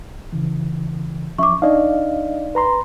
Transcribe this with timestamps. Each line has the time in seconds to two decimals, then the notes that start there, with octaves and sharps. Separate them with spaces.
0.33 C#3 E3
1.38 F3 C#4 E5 C#6 D6
1.62 D4 D#4 D5 D#5 F5
2.55 B4 A#5 C6